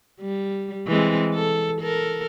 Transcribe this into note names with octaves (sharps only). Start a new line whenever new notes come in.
G3
E3 G#3 C4
A4
A4 A#4